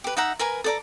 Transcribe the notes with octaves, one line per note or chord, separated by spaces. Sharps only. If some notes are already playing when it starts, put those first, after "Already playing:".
G4 B4
D#4 E5 F#5 A#5
A#4 B4 G#5 A#5
A4 D5 A#5